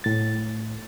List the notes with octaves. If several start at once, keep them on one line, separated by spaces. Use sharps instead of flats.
A2 A6